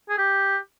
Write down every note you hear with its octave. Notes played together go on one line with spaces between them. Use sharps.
G#4
G4